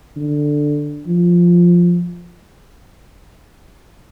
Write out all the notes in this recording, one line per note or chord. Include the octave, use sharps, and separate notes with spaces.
D3
F3